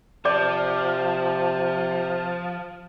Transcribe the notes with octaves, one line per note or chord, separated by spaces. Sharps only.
C3 F3 D5 A5 D6 G6